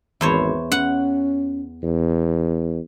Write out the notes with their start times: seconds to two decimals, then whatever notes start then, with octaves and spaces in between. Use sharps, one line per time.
0.21 G#1 E2 C5 C#5
0.72 C#4 F#5
1.83 E2